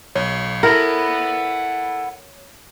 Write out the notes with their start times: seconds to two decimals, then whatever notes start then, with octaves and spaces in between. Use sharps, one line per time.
0.15 B1 C#5
0.63 E4 A4 A#4 F#5 B5